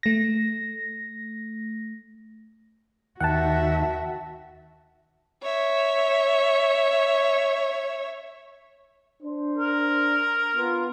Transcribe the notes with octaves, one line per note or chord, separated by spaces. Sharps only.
A3 A#6
D#2 F#4 E5 F#5 G5 A5
C#5 E5
D4 C5
A#4
B3 F4